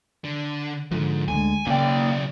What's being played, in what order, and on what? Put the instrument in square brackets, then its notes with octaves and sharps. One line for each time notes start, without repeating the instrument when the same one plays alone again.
[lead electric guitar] D3
[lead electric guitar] G#2 [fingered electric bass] D3 F3
[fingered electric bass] D2 G3 G#3 [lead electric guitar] G#5
[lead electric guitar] B1 D5 [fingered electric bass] C#3 [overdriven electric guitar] A#3 G5